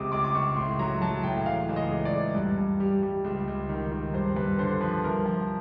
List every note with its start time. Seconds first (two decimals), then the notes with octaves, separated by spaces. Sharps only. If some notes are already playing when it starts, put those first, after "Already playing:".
Already playing: C#2 C3 D6 D#6
0.12 C#2 D6
0.24 D6
0.35 C#2 C#6
0.56 A2 C6
0.79 F#3 A#5
1.01 F#3 A5
1.23 A2 G5
1.45 E3 F5
1.69 C#2
1.76 D#5
1.91 C#2
2.05 D5
2.13 C#2
2.35 G2
2.58 G2
2.80 G3
3.03 G3
3.24 C#2
3.48 C#2
3.69 D#3
3.92 D#3
4.14 G2 C5
4.36 G2 B4
4.59 D3 C5
4.81 F3 B4
5.04 C2 A#4
5.26 F3